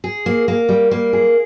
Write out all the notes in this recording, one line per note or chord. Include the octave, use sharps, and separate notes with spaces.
G#4
A#3
A#3
G3
A#3
G#4